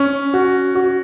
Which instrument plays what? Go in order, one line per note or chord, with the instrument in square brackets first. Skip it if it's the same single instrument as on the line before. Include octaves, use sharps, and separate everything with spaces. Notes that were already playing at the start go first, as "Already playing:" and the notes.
Already playing: [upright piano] C#4
F#4
F#4